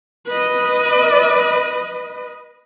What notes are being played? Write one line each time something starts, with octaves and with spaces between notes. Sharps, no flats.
B4 D#5